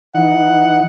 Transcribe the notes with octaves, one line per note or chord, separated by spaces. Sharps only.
E3 D#4 F#5